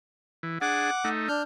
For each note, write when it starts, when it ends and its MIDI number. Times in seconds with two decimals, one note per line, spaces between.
0.43 0.58 52
0.61 0.90 62
0.61 0.90 68
0.61 1.09 78
0.61 1.09 86
1.04 1.29 57
1.04 1.29 63
1.28 1.42 62
1.28 1.42 89
1.28 1.42 91